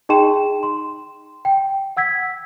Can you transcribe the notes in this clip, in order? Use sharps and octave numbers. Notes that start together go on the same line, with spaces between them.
D#4 G#4 D#5 G5 C6 E7
C6
G5
F#5 E6 G#6 B6